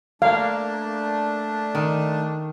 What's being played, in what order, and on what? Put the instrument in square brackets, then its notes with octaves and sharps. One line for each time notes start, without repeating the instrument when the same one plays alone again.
[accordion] A3 D4 [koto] A#3 [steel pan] F5
[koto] D#3